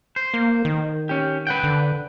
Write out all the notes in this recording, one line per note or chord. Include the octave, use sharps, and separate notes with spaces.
C5
A#3
D#3
C#4 G4
B4 F#5 G5
D3